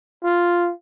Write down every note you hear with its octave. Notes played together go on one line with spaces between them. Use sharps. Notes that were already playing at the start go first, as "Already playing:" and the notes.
F4